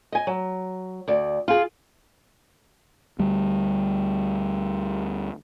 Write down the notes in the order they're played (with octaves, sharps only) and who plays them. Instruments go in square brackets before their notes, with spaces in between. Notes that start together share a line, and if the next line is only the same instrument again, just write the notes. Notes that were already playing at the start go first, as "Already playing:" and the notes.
[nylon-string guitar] D#5 G#5
F#3
D2 D5
F4 G#4
[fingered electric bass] D2 G3